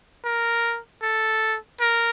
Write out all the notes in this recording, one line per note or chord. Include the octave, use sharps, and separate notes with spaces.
A#4
A4
A#4